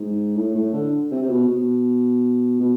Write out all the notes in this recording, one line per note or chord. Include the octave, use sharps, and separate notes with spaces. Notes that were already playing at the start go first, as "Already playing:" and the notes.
Already playing: G#2
A2
A2
D3
C3
C3
B2
B2
B2